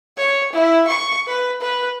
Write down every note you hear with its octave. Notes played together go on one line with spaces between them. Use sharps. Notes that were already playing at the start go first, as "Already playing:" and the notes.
C#5
E4
C#6
B4
B4